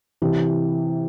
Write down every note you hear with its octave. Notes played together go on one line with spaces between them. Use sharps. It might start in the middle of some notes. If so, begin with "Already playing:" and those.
C3 E3